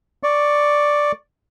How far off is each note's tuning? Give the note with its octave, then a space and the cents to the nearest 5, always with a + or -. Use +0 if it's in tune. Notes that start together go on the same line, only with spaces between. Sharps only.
D5 +0 C#6 +0